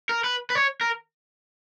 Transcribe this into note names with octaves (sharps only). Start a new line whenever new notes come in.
A#4
B4
B4
C#5
A#4